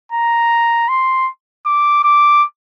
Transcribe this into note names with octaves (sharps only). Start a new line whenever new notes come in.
A#5
C6
D6
D6